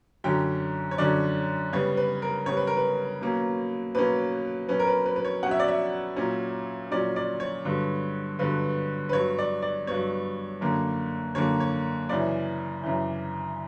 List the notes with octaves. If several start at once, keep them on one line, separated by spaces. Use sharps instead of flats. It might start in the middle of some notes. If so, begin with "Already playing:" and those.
F#2 D3 F#3 C#4 G5
C#5
F#2 D3 F#3 C#4 D5
C#3 G3 B3 C#5
B4
A#4
C#3 G3 B3 C#5
B4
A#4
B4
B2 F#3 A#3 C#4
B2 F#3 A#3 C#4 B4
B2 F#3 C#4 B4
A#4
B4
B4
B4
C#5
B2 F#3 C#4 F#5
E5
D5
E5
A#2 F#3 C#4
A#2 F#3 C#4 D5
D5
C#5
G2 D3 F#3 B3
G2 D3 F#3 B3 B4
B4
G2 F#3 B3 C#5
D5
D5
G2 F#3 B3 C#5
F#2 D3 A#3
F#2 D3 A#3 C#5
C#5
F#2 C#3 E3 D5
F#2 C#3 E3